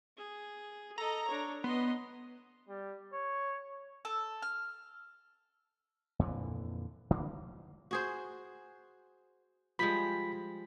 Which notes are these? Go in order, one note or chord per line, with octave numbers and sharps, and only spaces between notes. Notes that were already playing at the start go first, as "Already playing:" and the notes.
G#4
A4 D#5 A#5
D4 C#5
B3 D#5 C6
G3
C#5
A4
F6
F2 A#2 D3 E3
D3 E3 G#3 A#3
F#4 G#4 C5
F3 G3 G#3 B5 B6